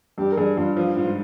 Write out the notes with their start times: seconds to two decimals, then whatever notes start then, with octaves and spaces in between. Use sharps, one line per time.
0.17 G2 G4
0.32 A#4
0.37 G2 G#4
0.57 G2 F4
0.77 F3 F4
0.97 G#2 F4